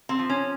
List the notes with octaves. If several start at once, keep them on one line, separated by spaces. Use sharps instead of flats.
C4
F3
C#4